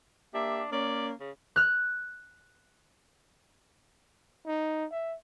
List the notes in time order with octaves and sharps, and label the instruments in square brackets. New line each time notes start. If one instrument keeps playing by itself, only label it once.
[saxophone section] A#3 G4 E5 [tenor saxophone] D4
[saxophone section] A#3 C#4 [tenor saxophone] D5
[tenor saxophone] C#3
[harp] F6 F#6
[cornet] D#4
E5